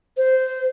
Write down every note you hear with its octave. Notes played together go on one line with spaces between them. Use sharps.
C5